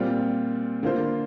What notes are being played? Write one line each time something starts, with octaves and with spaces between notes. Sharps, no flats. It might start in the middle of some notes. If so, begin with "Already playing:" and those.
Already playing: A#2 G3 C4 F4
D3 A#3 D4 F4 C5